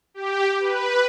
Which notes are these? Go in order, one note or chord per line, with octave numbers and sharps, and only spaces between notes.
G4
B4